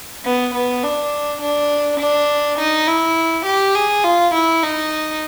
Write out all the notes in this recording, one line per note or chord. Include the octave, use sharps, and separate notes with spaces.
B3
B3
D4
D4
D4
D#4
E4
G4
G#4
F4
E4
D#4